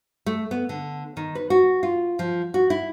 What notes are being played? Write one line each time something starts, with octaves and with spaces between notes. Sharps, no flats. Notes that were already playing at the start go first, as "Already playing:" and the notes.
A3
B3
D3
D#3
B4
F#4
F4
F3
F#4
E4